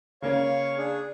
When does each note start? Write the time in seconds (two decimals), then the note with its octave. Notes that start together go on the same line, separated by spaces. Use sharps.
0.22 C#3 A#3 C#4 C#5 F5 C#6
0.78 D4 G#4